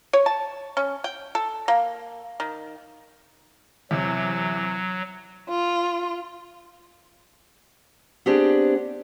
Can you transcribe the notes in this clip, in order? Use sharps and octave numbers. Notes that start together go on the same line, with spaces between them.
C#5
A5
C#4
G5
A4
A#3
D#3
E2 C3 F#3
F4
B3 C4 D4 G4 G#4